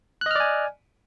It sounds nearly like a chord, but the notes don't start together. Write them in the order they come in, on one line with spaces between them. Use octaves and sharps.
F#6 D#5 F6 D5 G#5